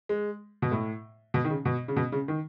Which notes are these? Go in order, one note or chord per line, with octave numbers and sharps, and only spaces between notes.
G#3
B2
A2
B2
D#3
C#3
B2
C#3
B2
C#3
D#3